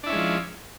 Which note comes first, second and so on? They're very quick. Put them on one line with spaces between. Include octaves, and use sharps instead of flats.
D4 E4 C#4 G#3 F3